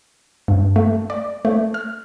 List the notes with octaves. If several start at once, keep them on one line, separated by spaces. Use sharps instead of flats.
G2
A3
D5
A3
F6